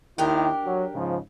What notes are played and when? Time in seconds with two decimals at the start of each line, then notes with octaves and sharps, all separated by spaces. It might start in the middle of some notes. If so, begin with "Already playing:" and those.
0.18 D#2 D#3 D4 E4 G4 A#4
0.65 F#3
0.94 G#2 C#3 F3